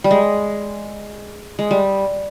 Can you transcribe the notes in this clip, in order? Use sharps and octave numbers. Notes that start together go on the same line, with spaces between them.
G3
G#3
G#3
G3